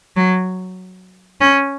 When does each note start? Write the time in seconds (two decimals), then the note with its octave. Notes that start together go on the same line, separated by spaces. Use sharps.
0.16 F#3
1.41 C#4